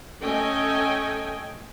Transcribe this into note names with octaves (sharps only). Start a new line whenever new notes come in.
A3 C#4 A4 D#5 G5 G#5